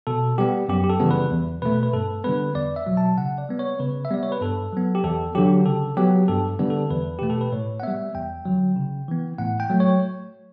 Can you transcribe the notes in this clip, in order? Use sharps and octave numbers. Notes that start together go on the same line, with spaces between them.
B2 A4
G3 B3 G4
F#2 G4
G4
A4
C#3 E3 G3 B3
B4
E2
B2 A3 B4
B4
G2 A4
D3 G3 B3 B4
E2 D5
E5
B2 F#3
A5
C#3 F#5
D5
G3 B3
C#5
C#3 B4
E5
G3 B3 D5
C#5
B4
G2 A4
F#3 B3
G4
E2 A4
D3 F#3 G4
C#3 A4
F#3 B3 G4
G2 A4
D3 G3 B3
A4
E2 B4
B2 A3 G4
A4
B4
A2 C#5
F#5
G3 B3 E5
E2 G5
D3 F#3
C#3
E3 B3
A2 F#5
G5
F#3 A3
C#5